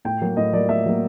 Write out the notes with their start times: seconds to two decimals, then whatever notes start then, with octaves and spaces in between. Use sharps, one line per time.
0.05 A2 G5
0.21 F#3 A#3
0.37 A2 D#5
0.53 F#3 A#3 D5
0.69 A2 E5
0.86 F#3 A#3